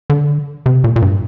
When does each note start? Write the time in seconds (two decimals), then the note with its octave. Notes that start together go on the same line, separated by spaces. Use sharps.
0.10 D3
0.66 C3
0.84 A#2
0.96 A#2
1.02 G2